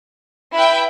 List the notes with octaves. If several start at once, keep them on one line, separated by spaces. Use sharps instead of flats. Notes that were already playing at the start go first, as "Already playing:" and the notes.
E4 B4 E5 G5